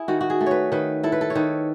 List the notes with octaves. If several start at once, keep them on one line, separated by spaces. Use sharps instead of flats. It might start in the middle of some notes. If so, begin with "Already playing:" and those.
Already playing: E4 G#4
D#3 F#4
F#4
G#4
A3
B4 C#5
D#3 B4
E4 A4
B4
A4
C#5
D#3 B4